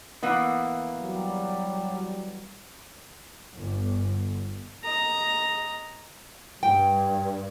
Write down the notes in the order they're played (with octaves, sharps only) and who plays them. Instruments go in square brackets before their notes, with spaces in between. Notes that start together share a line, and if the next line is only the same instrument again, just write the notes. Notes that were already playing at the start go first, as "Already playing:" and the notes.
[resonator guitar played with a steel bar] E3 A#3 B3
[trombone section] F#3 G3
[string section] G1
[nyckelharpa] D#5 A#5
[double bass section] G2 [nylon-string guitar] G5